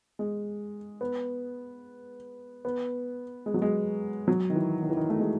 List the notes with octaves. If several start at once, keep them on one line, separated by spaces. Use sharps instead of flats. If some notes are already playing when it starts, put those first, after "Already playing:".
G#3
B3
B3
G#3
F#3
G#3
F#3
D#3
E3
D#3
E3
D#3
A3
G#3